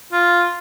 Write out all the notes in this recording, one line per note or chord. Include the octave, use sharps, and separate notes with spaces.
F4